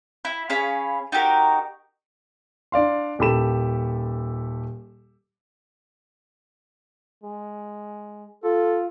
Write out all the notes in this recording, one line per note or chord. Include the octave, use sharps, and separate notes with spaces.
E4
C#4 G#4 F5 B5
D#4 F#4 G4 A#4
D4 D5 F5 C6
D#1 G4 A4 B5 E7
G#3
F4 A4